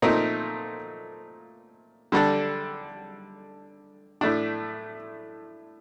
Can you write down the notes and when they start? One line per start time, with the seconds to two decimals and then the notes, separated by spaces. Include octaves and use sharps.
0.02 A#2 A3 C4 D#4 A#4
2.12 D3 G3 D4 A4
4.21 A2 A3 D4